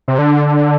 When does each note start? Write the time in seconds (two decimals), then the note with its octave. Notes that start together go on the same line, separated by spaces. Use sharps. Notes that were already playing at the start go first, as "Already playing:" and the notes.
0.08 C3
0.18 D3